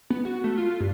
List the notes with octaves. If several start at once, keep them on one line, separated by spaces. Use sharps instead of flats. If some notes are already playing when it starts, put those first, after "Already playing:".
B3
F#4
A3
F4
G2